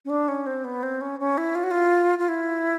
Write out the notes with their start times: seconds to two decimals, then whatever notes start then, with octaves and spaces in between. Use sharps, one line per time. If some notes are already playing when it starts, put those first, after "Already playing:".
0.05 C#4
0.10 D4
0.28 C#4
0.46 C4
0.64 B3
0.83 C4
1.01 C#4
1.20 C#4
1.38 E4
1.55 F4
1.64 F#4
1.71 F4
2.19 F4
2.28 E4